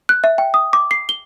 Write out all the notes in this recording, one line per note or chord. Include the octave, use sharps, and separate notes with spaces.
F#6
E5
G5
D#6
D6
C7
G7